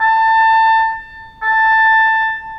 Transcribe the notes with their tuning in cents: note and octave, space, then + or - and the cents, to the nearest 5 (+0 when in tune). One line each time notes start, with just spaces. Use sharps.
A5 +25
A5 +10